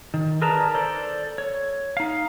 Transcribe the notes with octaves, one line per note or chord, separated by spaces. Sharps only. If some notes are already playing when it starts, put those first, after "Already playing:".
D#3
G#4 A#4 B4 D5 A5 A#5
A4 C5 D5
C#5
D#4 F5